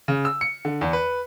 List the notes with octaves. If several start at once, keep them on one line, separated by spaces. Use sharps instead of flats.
C#3
E6
C#7
D3
E2
B4